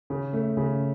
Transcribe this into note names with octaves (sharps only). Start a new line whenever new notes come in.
C#3
A3
C#3